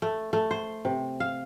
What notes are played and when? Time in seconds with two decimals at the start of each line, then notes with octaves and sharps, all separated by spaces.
0.02 A3
0.33 A3
0.51 C5
0.85 C3
1.20 F5